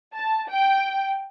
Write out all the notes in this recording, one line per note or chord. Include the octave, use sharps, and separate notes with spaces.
A5
G5